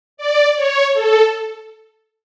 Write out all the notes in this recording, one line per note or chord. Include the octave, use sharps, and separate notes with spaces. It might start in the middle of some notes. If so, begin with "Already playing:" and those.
D5
C#5
A4